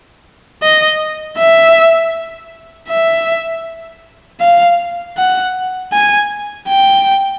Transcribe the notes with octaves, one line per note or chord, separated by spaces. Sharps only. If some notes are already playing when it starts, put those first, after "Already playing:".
D#5
E5
E5
F5
F#5
G#5
G5